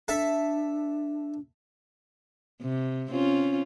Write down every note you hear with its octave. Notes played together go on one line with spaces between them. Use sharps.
D4 A4 E5
C3
C4 C#4 F4